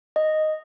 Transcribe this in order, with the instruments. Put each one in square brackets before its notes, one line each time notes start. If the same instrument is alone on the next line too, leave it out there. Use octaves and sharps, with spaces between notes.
[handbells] D#5